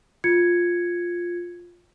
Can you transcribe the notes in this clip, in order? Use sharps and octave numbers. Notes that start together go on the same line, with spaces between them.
F4 G#6 C#7